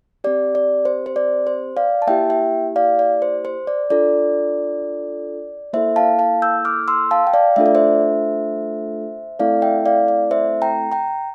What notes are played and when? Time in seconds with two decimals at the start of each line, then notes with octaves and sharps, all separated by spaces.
0.24 C4 G4 D5
0.55 D5
0.85 C5
1.06 C5
1.16 D5
1.47 C5
1.77 D5 F5
2.02 A5
2.07 A#3 E4 G4 E5 G5
2.30 E5 G5
2.76 D5 F5
2.99 D5
3.22 C5
3.45 C5
3.67 D5
3.90 D4 F4 A4 D5
5.73 A#3 E4 A4 C5 E5
5.96 F5 A5
6.19 F5 A5
6.42 E6 G6
6.65 D6 F6
6.88 C6 E6
7.11 F5 A5
7.27 G5
7.34 D5 F5
7.56 A3 D4 F4 A4 E5
7.66 D5
7.75 C5 E5
9.39 A3 C4 E4 A4 D5 F5
9.62 E5 G5
9.86 D5 F5
10.08 D5
10.31 C5 E5
10.62 G5 A#5
10.92 G5 A#5